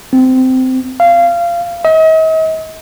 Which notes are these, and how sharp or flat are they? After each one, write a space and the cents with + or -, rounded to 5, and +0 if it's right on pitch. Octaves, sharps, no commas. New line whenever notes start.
C4 -20
F5 -20
D#5 +45